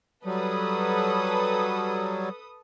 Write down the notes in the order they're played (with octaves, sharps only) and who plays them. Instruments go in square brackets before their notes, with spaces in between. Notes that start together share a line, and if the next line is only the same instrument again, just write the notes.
[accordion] F#3 G3 [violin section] A4 B4 D#6